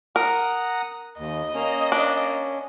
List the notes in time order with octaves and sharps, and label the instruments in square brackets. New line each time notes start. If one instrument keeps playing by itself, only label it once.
[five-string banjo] A#4 [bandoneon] F#5 A#5 D#6
[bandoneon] D#2 [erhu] D#5
[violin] A#3 [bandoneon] C#4
[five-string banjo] D4